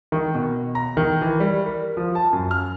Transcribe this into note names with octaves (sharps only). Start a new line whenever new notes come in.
D#3
B2
A#5
D#3
E3
G3
A#4
F3
A5
F#2
F6